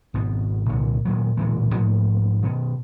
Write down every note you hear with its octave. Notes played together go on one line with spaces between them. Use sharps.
G#1 B2
C2 A#2 D3
A#2 D#3 F#3
D1 A#2 E3 G#3
G#2 F3 A3 A#3
B2 D#3